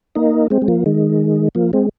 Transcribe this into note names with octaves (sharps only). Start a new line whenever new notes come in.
A#3 D#4
G#3 C4
G#3
F3 A#3
D#3 G#3
F3 A#3
G#3 C4